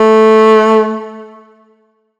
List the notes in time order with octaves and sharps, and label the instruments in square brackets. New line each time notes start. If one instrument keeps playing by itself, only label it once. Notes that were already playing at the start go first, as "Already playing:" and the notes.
Already playing: [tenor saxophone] A3